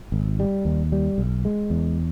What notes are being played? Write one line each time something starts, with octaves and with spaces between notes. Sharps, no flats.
G#1
G3
D#2
G3
B1
G#3
E2